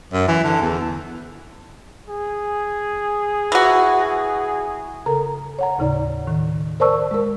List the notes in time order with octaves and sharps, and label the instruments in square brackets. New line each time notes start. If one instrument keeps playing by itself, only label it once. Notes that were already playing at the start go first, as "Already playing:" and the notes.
[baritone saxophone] F#2
E3
D3
E2
[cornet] G#4
[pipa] E3 F#4
[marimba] C#3 A4 A#4 A#5
C#5 F#5 A#5
D#2 A2 C#3 D#4 D5
A2 D#3
A#4 C5 D5 A5 C#6 E6
G#3 A#4